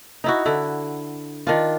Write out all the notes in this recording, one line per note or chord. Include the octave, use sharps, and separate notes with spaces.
D#4 E4 F#4
D3 E4
D#3 D4 F4